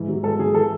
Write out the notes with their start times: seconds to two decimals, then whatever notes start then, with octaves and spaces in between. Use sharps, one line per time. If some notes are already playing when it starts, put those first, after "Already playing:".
Already playing: G#2 E3
0.08 F#3
0.23 G#2 A4
0.39 F#3 G#4
0.55 E3 A4